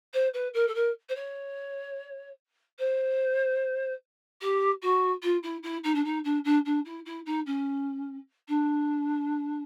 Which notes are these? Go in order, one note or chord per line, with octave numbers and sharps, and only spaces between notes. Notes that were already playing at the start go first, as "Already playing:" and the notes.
C5
B4
A#4
A4
A#4
C5
C#5
C5
G4
F#4
F4
E4
E4
D#4
D4
D#4
D4
D4
D4
E4
E4
D#4
C#4
D4